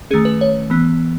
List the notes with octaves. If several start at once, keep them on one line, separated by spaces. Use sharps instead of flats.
D#3 A3 C#4 G#4
B4
C#5
E3 B3